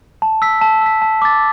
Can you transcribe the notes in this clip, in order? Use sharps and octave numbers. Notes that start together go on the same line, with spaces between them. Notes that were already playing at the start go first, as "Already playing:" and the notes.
A5
E6 B6
A5
E6 B6
A5
D6 A6